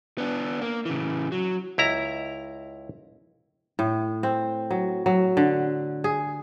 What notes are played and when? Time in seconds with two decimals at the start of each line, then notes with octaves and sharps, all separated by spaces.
0.18 B3 D4
0.61 A#3
0.85 C#3 E3
1.32 F#3
1.78 C#2 E4 A#5
3.79 A2
4.23 C4
4.70 F#3
5.06 F#3
5.37 D3
6.04 G#4